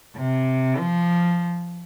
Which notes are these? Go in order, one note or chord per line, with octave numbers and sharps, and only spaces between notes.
C3
F3